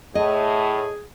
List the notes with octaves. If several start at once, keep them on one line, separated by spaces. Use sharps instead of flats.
A2 G#4 D#5